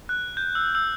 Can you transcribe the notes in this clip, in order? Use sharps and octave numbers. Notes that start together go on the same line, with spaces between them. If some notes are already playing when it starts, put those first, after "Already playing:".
F#6
G6
E6
E6